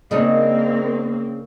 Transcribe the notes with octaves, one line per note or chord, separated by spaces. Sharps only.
C#3 A#3 C4 D4 D#4